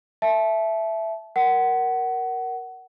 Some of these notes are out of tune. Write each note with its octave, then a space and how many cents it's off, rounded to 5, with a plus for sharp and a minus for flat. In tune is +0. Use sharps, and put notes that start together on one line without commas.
E5 +5 A5 -30
A#4 +10 F#5 +20